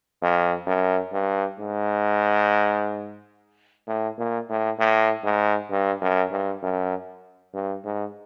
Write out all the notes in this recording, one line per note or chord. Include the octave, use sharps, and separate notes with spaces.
F2
F#2
G2
G#2
A2
A#2
A2
A2
G#2
G2
F#2
G2
F#2
G2
G#2